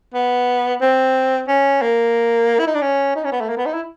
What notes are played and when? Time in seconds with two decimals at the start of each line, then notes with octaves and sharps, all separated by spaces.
0.14 B3
0.81 C4
1.48 C#4
1.82 A#3
2.59 E4
2.67 D#4
2.74 D4
2.81 C#4
3.15 D#4
3.24 C#4
3.32 B3
3.41 A3
3.49 A#3
3.57 B3
3.66 D#4
3.74 E4